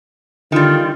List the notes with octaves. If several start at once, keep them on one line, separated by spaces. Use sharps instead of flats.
D3 D#3 G3 F4